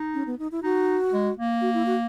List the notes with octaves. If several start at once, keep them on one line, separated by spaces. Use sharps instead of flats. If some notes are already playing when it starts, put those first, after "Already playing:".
Already playing: D#4
C#4
B3
D#4
E4
D#4 F#4
G#3
A#3
F#4
E4
F#4